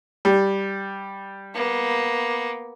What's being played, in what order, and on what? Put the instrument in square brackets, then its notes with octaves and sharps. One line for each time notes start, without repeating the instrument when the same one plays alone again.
[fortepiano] G3
[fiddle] A#3 B3